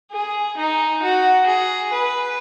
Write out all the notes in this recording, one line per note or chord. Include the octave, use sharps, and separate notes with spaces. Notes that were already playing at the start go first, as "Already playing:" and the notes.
G#4
D#4
F#4
G#4
B4